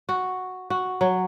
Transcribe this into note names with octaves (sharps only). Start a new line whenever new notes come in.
F#4
F#4
F#3